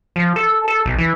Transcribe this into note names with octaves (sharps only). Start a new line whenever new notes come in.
F3
A4
A4
B1
E3